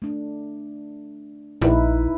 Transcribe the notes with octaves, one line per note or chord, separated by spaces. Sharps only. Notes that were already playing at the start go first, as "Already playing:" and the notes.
A3 D4
A#1 D#4 E4 B4